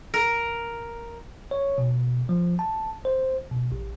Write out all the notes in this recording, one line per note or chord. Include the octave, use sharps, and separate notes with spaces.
A#4
C#5
B2
F3
A5
C5
B2
A1